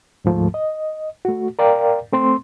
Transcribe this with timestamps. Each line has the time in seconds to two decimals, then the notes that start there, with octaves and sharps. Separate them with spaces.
0.25 D2 G#2 F3 A3
0.54 D#5
1.25 A3 F#4
1.59 A#4 D5 F5 G5
2.12 A3 C4 C6